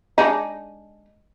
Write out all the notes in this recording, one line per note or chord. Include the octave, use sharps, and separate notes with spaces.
G#3 D4 D#4